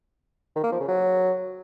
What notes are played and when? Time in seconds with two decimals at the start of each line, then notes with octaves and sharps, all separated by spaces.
0.56 D#3
0.64 A#3
0.72 F3
0.80 C#3
0.88 F#3